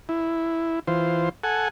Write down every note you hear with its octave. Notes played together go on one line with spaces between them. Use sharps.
E4
E3 F4 C5
A4 F#5 G#5